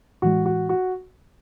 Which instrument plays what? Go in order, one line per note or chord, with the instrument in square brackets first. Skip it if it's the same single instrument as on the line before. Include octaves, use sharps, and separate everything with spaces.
[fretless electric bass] A2 E3 G#3 [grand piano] F#4
[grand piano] F#4
F#4